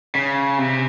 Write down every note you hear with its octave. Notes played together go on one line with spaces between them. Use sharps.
C#3
C3